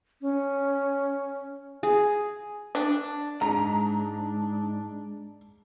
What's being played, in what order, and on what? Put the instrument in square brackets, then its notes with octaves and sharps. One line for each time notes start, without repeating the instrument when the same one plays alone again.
[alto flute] C#4
[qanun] G#4
[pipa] D4
[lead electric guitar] G#2 [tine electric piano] G#3 [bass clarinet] D4 [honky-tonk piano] A#5